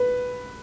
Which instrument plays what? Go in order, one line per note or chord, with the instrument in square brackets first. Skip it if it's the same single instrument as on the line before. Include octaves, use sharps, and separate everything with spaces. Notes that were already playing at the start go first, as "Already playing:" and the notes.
Already playing: [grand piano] B4